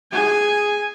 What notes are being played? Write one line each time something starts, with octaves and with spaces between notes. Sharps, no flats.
G#4 G#5